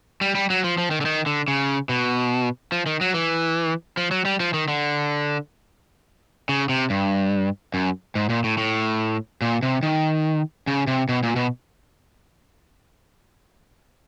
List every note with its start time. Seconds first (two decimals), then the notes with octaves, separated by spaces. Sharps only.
0.21 G3
0.35 G3
0.50 F#3
0.64 F3
0.78 F3
0.91 D#3
1.01 D3
1.06 D#3
1.26 D3
1.48 C#3
1.89 B2
2.72 F3
2.86 D#3
3.01 F#3
3.14 E3
3.97 F3
4.11 F#3
4.25 G3
4.40 F3
4.54 D#3
4.68 D3
6.49 C#3
6.69 C3
6.90 G2
7.74 F#2
8.15 G#2
8.30 A#2
8.44 A2
8.58 A2
9.42 A#2
9.63 C3
9.83 D#3
10.67 C#3
10.87 C3
11.09 B2
11.23 A#2
11.36 B2